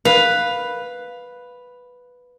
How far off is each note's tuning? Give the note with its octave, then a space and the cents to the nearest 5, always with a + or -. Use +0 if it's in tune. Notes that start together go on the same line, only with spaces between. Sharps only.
B4 +0 F5 +10